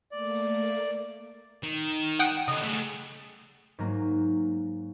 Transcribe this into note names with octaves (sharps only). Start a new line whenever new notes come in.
A3 A#3 D5
D#3
F#5 G5 D#6
C#3 A4 D#5
A3 G#4
G#2 F#3 A#3